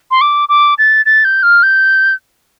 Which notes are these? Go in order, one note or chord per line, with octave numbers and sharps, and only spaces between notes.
C6
D6
D6
A6
A6
G6
F6
G6